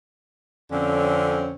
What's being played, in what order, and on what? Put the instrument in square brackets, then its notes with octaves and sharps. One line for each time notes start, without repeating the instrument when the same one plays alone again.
[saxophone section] F2 D3 C4 C#4